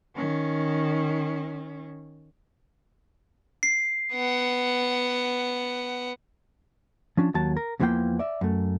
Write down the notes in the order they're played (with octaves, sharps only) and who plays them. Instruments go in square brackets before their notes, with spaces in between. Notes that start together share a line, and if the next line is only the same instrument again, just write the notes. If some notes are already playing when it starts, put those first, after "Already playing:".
[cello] D#3 C#4
[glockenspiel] C7
[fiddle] B3 F#5
[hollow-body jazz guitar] F3 C#4 D4
D#2 F#3 A5
A#4
E2 B2 E3 F3 A#3 G5
D5 E5
F#2 A3